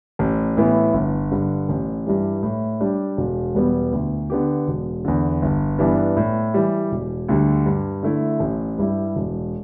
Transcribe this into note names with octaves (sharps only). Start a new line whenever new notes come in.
A1
A2 E3 B3
G1
G2 D3
A1
G2 E3 G3
A2
G3 D4 G4
E1
E2 B2 G3 B3
D2
D3 B3 G4
E1
E2 D3
G1
G2 E3 B3 D4
A2
E3 G3
E1
D2 D3 G3
G2
D3 A3 E4
A1
G2 G3 E4 G4
E1